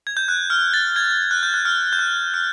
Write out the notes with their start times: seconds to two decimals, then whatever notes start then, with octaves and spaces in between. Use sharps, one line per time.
0.07 G#6
0.17 G6
0.28 F#6
0.50 F6
0.74 A6
0.96 G#6
1.31 F#6
1.43 G6
1.54 F#6
1.65 F6
1.93 G6
1.99 F#6
2.34 F6